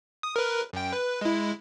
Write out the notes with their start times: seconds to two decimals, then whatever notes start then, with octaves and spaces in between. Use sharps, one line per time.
0.23 D#6
0.36 A#4 B4
0.73 F#2 G5
0.93 B4
1.21 G#3 E4